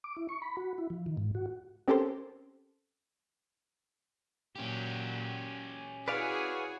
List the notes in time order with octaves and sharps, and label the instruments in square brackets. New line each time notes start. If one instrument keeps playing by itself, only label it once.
[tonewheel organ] D6
E4
C#6
B5
F#4
E4
F3
D#3
G#2
F#4
[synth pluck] C4 C#4 G4 A4 A#4 C5
[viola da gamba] A#2 F#3 [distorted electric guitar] C#4 G4
[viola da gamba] E4 F#4 C#5 [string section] G#4 [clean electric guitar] B4 D5 F5